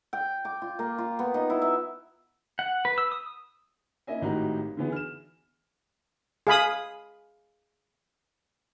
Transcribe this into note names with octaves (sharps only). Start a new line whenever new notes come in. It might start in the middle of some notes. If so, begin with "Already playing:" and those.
G5
D6
F4
A#3
F4
B3
D#4
E4
E5
F#5
B4
E6
D#6
A#3 C#4 E4 D#5 E5 G#5
G#1 A2 D#4 F#4 G4 A#5
D3 E3 B3 G#4
F6 E7
G#4 F5 B5 D#6